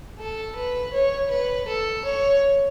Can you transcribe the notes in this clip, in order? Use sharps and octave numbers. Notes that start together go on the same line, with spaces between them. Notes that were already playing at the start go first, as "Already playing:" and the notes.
A4
B4
C#5
B4
A4
C#5